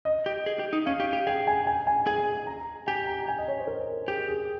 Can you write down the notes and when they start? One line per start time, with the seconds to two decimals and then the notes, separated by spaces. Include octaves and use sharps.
0.05 D#5
0.26 G4
0.46 G#4
0.59 G4
0.73 D#4
0.86 C#4 F5
1.00 G4
1.13 G4
1.27 G#4 G5
1.47 G#5
1.67 G#5
1.87 G#5
2.07 G#4 G#5
2.47 A#5
2.87 G4 G#5
3.07 A#5
3.28 G#5
3.38 D#5
3.48 C#5
3.58 C5
3.67 A#4
4.08 G4 G#4
4.28 G#4